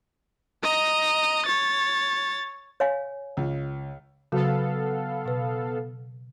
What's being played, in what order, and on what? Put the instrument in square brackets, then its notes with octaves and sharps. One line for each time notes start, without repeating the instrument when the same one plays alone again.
[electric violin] D#5 A#5
C#5 A6
[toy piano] C#5 F5 G#5
[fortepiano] C#2
[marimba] C#3 F#3 F#4 [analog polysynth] B3 A4 F5
[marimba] B2 B4